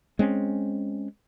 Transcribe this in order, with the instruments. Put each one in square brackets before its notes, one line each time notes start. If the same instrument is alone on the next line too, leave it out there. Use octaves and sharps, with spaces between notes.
[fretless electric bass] G#3 C4 C#4